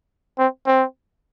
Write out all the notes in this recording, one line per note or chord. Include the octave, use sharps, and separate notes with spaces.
C4
C4